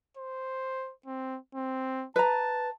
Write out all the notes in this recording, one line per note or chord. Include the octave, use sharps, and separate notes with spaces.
C5
C4
C4
B4 A5 A#5